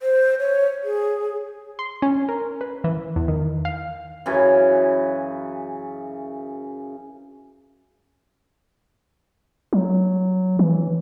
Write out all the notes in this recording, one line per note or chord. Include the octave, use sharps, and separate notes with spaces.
C5
C#5
G#4
C6
C#4
A#4
B4
E3
E2
D#3
F5
F#2 C#3 E3
F#3
E3